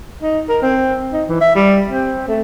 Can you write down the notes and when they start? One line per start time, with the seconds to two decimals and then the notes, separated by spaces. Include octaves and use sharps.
0.22 D#4
0.49 A#4
0.62 C4
1.13 D#4
1.29 E3
1.41 E5
1.56 G3
1.89 C4
2.28 A3